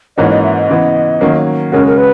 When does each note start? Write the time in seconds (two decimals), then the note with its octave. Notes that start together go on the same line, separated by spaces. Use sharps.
0.17 G#2 E3 A#3 C#4 F#4 D#5
0.31 D#5
0.43 E5
0.56 D#5
0.69 C#3 E3 B3
1.21 D#3 F#3 A#3 C#4
1.72 C#3 G#3 C#4 F#4 A#4
1.87 A#4
1.98 B4